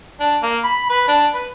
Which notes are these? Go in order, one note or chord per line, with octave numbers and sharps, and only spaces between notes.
D4
A#3
B5
B4
D4
B4